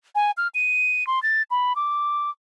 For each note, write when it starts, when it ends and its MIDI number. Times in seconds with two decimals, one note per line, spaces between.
0.15 0.31 80
0.37 0.48 89
0.55 1.07 99
1.07 1.22 84
1.23 1.42 93
1.51 1.76 83
1.76 2.30 86